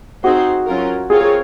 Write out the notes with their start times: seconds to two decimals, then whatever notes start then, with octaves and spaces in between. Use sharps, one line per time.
0.24 C4 D#4 F#4 G#4 C5
0.67 F#3 C#4 F4 A#4
1.10 C4 F4 G#4 A#4 C#5
1.21 G#4